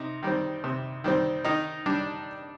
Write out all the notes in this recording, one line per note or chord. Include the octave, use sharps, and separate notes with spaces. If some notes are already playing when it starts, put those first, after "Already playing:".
Already playing: C3 D#4
D#3 G3 C4
C3
D#3 G3 C4
D#3 D#4
G3 D4